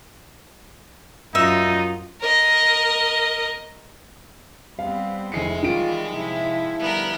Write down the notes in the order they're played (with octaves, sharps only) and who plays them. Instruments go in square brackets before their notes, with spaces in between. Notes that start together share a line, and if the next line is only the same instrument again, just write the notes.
[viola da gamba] F#2 F4 [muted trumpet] D#4 [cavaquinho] E5
[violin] A#4 D#5
[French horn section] G3 [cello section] B3 C4 [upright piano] F5
[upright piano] F1 C7 C#7 [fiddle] G#3 [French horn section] E4
[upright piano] D#3 D7 [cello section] E3 G3 [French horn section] F4
[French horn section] C3 [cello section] F3 E4
[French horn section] D3 G3 [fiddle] B3 A#4